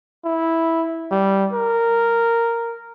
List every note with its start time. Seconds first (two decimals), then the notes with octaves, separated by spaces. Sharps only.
0.25 E4
1.11 G3
1.53 A#4